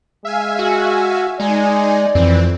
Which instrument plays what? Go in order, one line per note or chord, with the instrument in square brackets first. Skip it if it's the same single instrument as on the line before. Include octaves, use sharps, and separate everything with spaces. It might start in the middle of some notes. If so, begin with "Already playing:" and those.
[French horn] G#3 [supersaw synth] E5 F5 G#5
[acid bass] F#4
[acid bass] G#3 [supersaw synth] D#4 G#5 [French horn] D5
[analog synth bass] F2 [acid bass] E3 [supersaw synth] C4